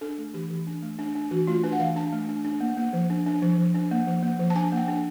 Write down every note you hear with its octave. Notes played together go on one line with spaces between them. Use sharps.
D4 A4
A3
E3 G4
E3
D4
A3
D4
D4
E3 F#4
A3 F4
D4 B4
F#5
E3 F5
D4 A5
A3
D4
D4
A#3
A#3
F3
D4
D4
F3
F3
D4
A#3
F3
A#3
F3
A5
D4 G#5
A#3 G5
D4